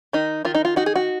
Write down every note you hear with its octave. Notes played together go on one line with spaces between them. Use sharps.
D#3 D#4
D#3 F4
D#4
F4
D#4 F#4
G#4
F#4